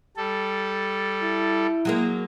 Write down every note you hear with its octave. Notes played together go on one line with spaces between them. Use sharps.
G3 A4
E4
F#3 G#3 A#3